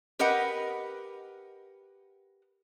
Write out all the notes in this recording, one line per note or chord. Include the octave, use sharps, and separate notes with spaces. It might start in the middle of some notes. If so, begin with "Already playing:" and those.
G4 A#4 B4 D#5 F#5